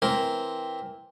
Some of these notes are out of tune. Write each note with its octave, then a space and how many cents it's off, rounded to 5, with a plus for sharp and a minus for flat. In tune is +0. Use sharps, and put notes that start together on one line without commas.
E3 +0 C4 +0 A#4 +0